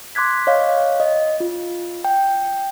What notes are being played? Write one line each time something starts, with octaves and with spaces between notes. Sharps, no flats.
C6 D6 F#6 G#6 B6
C#5 D#5 F5
D#5
F4
G5